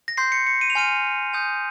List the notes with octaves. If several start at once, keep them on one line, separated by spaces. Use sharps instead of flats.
A#6
C6 G6 C7
C#7
C#7
D#7
F7
G#5 C6 F6 D#7
G#5 D#6 G6